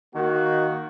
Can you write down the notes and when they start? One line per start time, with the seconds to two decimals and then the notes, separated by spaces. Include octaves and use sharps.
0.14 D#3 A#3 F#4